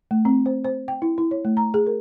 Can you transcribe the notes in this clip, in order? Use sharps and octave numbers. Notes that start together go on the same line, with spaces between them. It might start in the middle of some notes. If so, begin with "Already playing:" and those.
A3
C4
C5
C5
G5
E4
E4
C#5
A3
A#5
G#4
A#4